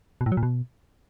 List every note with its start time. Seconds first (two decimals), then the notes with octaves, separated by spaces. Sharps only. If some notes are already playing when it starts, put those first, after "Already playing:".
0.21 B2
0.26 A2
0.32 F#3
0.37 A#2
0.43 B2